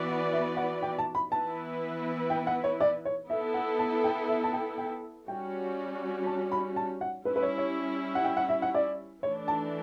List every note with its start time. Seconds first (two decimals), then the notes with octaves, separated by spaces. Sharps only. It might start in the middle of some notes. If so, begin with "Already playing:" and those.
Already playing: E3 B3 F#4 B4 D5
0.08 F#5
0.33 E5
0.57 F#5
0.82 G5
0.98 A5
1.15 B5
1.31 E3 B3 E4 B4 A5
2.30 G5
2.47 F#5
2.64 C#5
2.80 D5
3.05 C#5
3.30 B3 E4 A4 E5
3.54 F#5
3.79 A5
4.04 G5
4.29 E5
4.44 A5
4.53 G5
4.78 G5
5.28 G3 C#4 F#4 G5
6.26 A5
6.52 B5
6.76 A5
7.01 F#5
7.25 G3 C#4 E4 B4
7.36 B4
7.42 C#5
7.58 C#5
8.15 F#5
8.24 G5
8.37 F#5
8.49 E5
8.62 F#5
8.75 D5
9.23 E3 A3 D4 C#5
9.48 A5